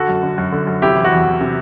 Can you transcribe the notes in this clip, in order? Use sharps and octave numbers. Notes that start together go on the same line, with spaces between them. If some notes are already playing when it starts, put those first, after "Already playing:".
Already playing: D3 F#4 A4
F#2
D3
F#2
D3
F#2
C3 E4 G4
E3
F#4
E2
E2
C3